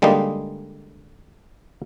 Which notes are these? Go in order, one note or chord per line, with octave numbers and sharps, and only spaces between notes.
D3 G3 G#3 A#3 D#4